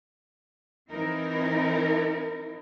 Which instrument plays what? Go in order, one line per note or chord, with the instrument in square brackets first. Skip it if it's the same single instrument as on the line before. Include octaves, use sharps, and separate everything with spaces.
[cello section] E3 C4 D#4 E4 A#4